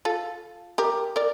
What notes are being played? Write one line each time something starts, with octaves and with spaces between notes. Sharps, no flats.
F4 A4
G4 A#4
A#4 D5